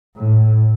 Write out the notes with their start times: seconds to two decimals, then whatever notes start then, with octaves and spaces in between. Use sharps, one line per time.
0.16 A2